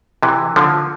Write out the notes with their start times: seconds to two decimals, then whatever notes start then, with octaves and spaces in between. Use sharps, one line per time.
0.23 C3 E3
0.56 D3 F3